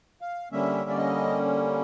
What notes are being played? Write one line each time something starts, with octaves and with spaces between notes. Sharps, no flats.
F5
D3 G3 A#3 C#4 E5
D5
D#5